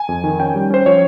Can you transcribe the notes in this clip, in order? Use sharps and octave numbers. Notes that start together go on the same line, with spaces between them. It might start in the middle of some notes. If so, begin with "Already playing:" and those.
Already playing: G#5
F2
D#3
C#4 G5
G3
C#4 C5
F3 C#5